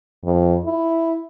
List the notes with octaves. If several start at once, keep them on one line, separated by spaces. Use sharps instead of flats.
F2
E4